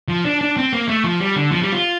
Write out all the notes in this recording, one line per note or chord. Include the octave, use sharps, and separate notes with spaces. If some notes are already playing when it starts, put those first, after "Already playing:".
F3
D4
D4
C4
A#3
A3
F3
G3
D3
F3
G3
F4